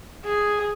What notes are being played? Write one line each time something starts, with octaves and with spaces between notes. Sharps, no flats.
G#4